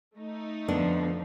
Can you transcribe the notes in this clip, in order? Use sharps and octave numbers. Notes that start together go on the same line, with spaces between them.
A3 D#4
F2 D3 F3 B3 D4